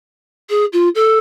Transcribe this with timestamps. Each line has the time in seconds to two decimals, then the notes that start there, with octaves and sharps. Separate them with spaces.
0.50 G#4
0.73 F4
0.95 A4